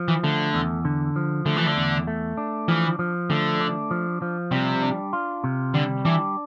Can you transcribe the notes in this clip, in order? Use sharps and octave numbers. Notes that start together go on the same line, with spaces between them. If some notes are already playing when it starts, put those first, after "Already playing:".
Already playing: F3
E3
D3 A3
E2
D3
F3
D3 A3
E3
D3
E2
A3
D4
E3 F3
F3
D3 A3
D4
F3
F3
C3 G3
D4
F4
C3
D3 G3
E3 D4